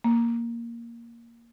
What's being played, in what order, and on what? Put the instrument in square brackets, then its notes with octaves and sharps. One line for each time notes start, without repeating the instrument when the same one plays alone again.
[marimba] A#3